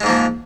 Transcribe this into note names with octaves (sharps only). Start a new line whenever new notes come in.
G#2 F3 G#3 A#3